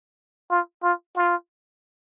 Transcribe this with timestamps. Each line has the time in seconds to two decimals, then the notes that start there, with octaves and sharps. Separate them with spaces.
0.50 F4
0.83 F4
1.16 F4